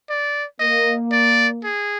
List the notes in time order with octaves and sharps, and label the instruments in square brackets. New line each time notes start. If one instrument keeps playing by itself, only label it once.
[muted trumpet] D5
[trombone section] A#3 [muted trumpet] D#5
[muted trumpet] D5
G#4